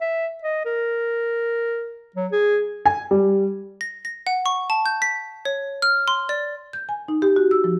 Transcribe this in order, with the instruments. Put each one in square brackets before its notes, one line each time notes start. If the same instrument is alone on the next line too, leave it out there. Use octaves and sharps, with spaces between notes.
[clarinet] E5
D#5
A#4
F#3
G#4
[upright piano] G#5
G3
[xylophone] A#6
A#6
F#5
C#6
A5
G6
B6
C#5
F6
C6
D5
[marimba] G6
G#5
D#4
G4
F#4
E6
F3